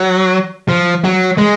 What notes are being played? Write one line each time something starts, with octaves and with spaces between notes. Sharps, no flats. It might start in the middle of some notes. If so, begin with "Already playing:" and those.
Already playing: F#3
F3
F#3
G#3